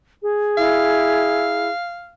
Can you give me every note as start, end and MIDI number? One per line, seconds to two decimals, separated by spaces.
0.23 1.70 68
0.57 1.68 64
0.57 2.13 77